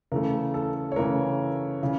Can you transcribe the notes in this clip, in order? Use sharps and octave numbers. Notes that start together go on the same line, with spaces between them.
C#3 E3 A3 A#4
A4
C#5
C#3 E3 A3 A#4
C#3 E3